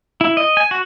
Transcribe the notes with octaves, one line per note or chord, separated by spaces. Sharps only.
E4
D#5
G#5
F#4